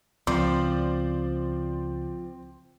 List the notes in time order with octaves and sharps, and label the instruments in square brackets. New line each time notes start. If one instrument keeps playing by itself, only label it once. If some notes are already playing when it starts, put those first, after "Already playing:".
[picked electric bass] C#2 [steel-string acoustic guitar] F3 [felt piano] C4 [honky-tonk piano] C5 D5 D6